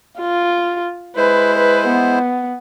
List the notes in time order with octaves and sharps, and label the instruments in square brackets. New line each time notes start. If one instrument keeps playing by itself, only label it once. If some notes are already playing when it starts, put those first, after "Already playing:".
[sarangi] F4
[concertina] G#3 E4 C5 [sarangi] B4
[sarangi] B4
B3